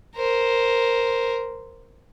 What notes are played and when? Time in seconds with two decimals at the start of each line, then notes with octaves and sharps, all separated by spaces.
0.16 A#4 C5